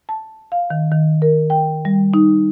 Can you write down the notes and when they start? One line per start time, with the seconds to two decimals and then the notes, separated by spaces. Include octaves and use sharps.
0.09 A5
0.52 F5
0.70 D#3
0.92 D#3
1.22 A#4
1.50 G5
1.85 G3
2.14 D#4